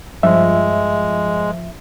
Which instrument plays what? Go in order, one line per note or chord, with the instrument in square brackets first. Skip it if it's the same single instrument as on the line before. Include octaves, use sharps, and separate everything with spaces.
[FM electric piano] G2 [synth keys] F3 [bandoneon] G#3 [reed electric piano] E5